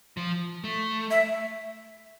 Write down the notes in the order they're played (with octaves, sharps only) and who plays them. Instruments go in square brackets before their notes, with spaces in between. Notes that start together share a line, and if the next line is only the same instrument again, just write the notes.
[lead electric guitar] F3
A3
[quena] E5